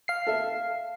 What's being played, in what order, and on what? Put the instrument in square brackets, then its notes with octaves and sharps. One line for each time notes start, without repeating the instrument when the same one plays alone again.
[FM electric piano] F5 C7
[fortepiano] A4 E5